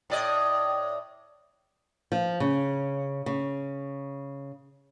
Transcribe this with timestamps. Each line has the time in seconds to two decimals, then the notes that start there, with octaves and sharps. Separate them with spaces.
0.10 A2 D5 D#5
2.12 F3
2.40 C#3
3.26 C#3